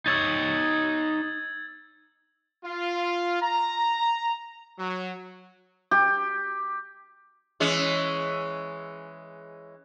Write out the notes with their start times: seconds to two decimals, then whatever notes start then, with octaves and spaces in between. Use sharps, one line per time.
0.06 D#4 C#5 E6 G#6 A6
2.65 F4
3.41 A#5
4.79 F#3
5.91 G4
7.60 E3 G#3 C#4